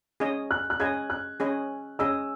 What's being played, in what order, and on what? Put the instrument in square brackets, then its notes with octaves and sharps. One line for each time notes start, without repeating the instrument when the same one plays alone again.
[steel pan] C#4 G#4 D#5
[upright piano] F#6
F#6
[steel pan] C#4 G#4 D#5 [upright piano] G#6
[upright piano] F#6
[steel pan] C#4 G#4 D#5
[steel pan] C#4 G#4 D#5 [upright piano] E6